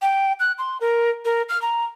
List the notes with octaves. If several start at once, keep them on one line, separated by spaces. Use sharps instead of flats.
G5
F#6
C6
A#4
A#4
F6
A#5